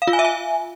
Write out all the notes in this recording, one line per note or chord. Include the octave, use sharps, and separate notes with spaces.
F5
F4
G#5
E5
G#5